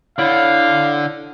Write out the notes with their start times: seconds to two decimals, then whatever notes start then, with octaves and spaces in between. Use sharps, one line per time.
0.19 D3 E4 C#5 D5 F5